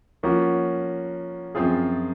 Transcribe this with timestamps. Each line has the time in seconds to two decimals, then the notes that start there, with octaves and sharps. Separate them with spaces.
0.23 F3 A#3 C#4 F#4
1.55 F#2 F3 C4 F4 G#4